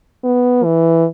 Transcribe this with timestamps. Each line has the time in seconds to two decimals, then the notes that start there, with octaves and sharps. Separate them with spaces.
0.24 B3
0.64 E3